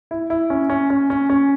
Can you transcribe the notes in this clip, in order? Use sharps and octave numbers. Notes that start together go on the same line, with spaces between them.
E4
E4
C#4
C#4
C#4
C#4
C#4